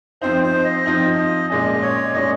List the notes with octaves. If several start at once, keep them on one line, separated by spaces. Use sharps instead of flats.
F3 C4 D#4 C5
C5
D#5
F3 C4 D#4
A#2 G#3 C#4 D#5
C#5
A#2 G#3 C#4 D#5